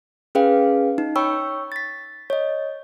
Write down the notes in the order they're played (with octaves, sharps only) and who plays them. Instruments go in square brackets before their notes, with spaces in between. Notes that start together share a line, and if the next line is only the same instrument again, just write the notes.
[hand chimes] C#4 G#4 B4 F5 G5
D#4
C#5 G5 B5 C#6 E6
A6 B6
C#5 D#5